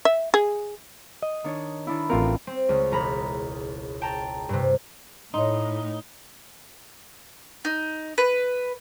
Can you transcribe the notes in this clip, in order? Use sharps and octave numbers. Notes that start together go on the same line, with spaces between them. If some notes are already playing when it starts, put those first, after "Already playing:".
E5
G#4
D#5
D#3 D4 C#5
D#3 D4 E4
A1 C4 D4 F4 A#4
C4
C#2
E1 A#5 B5
G5 A5 A#5
G2 C3
A2 D#4 C#5 D#5 C6
D#4
B4